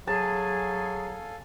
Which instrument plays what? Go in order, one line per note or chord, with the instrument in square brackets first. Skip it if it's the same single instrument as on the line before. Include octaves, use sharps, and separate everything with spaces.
[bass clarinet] F#3 [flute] G#4 [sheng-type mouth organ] A4 F5 G#5 [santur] A5